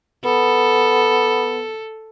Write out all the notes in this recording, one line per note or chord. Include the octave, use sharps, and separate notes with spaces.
B3 A4